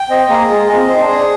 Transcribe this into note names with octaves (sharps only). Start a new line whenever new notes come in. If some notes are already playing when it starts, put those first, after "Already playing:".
Already playing: G5
C4 D#5
A#3 G#4
G#3 F4
A#3 D#5
C4
C5
D#4
D4
G#4